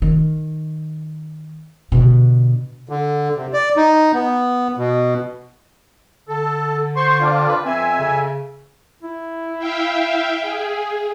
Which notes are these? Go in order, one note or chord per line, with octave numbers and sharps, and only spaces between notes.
D#3
B2 D3
D3
C3
D5
D#4
B3
B2
D3 A4
C5 C6 C#6
C4 D4 F4
B4
F2 C4 E5 G#5
C#3
E4
E5 F5 G5
G#4